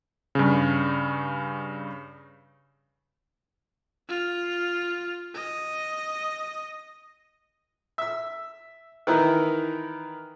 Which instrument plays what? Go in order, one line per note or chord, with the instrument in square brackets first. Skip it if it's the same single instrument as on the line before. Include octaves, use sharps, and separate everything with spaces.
[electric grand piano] G2 C#3
[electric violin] F4
D#5
[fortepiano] E5 E6
D#3 E3 E4 A#4 B4